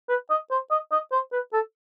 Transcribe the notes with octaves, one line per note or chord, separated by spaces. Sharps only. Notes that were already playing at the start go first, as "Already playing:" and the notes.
B4
D#5
C5
D#5
D#5
C5
B4
A4